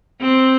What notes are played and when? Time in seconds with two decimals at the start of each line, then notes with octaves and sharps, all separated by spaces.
0.22 C4